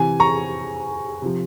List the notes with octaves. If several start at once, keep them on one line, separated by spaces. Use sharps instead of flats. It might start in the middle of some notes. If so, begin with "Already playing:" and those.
Already playing: C3 E3 G#5
A#5 C#6
C3 F3